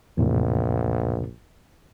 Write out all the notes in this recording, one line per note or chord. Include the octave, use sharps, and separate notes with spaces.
A#1 E2 A2 C3